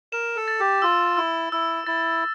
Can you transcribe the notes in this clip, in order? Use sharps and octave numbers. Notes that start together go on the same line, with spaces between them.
A#4 E7
A4
A6
G4
F4 E6
E4 E6
E4 E6
E4 A6